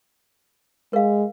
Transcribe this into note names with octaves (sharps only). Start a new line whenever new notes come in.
G#3 A#4 F5